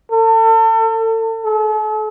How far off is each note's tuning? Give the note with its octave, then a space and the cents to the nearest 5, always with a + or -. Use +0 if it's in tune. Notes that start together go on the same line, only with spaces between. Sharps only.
A4 +35
A4 -45